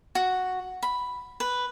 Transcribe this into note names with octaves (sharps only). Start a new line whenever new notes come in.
F#4
B5
B4